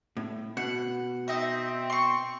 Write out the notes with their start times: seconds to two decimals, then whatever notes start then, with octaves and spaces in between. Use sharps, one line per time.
0.17 A2
0.57 B2 F#5
1.28 C4 D#4 D#5 E5
1.90 C6 C#6